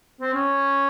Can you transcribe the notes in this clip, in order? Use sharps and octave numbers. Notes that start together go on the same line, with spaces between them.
C4
C#4